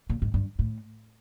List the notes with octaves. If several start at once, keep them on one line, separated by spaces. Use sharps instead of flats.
A#2
G#2
G2
A2